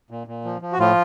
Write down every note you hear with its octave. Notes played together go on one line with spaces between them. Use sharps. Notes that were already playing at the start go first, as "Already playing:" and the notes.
A#2
A#2
F3
F3
F#4
A2 F3 F4